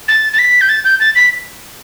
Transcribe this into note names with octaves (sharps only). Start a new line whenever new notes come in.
A6
A6
B6
G6
A6
G6
A6
B6